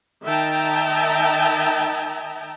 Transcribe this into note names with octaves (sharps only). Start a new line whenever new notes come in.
D#3 D#5 E5 G5 A5 A#5